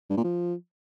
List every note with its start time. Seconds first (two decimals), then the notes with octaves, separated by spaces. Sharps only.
0.10 G2
0.17 A#2
0.24 F3